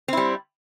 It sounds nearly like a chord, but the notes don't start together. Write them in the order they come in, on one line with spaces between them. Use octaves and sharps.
C4 E4 G3